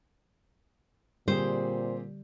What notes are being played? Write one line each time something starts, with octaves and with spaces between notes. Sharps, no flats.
A#2 D3 G3 C4 G4 G#4 C5